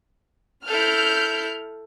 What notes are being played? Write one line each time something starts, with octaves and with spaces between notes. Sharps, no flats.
E4 A4 F6 G6